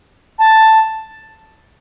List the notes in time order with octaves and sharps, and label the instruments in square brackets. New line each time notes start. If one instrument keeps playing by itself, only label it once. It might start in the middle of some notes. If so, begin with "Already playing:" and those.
[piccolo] A5